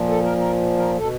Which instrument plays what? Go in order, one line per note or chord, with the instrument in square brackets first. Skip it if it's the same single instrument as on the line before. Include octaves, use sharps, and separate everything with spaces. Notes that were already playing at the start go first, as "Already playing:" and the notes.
Already playing: [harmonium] A#2 F3
A4
A#4
A#4
A#4
B2 A4